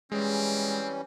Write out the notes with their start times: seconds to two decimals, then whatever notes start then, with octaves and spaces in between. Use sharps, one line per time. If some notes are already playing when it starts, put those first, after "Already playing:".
0.12 E3 G3 G#3 C4 C#4